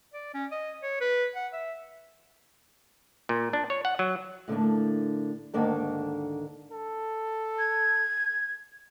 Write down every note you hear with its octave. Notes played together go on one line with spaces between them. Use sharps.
D5
C#4
D#5
C#5
B4
F#5
E5
A#2
D4
C#5
F#5
F#3
A2 D3 A#3 D4
D2 G#2 D#3 A#3 D4 A4
A4
G#6